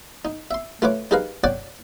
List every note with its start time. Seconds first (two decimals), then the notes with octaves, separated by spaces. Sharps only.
0.25 D#4
0.51 E5 C6
0.82 A3 F4 B4 C#5 D6
1.11 D#4 G4 G#4 A#4 B4 F5
1.44 C#5 D5 F#5 G5 A5 D6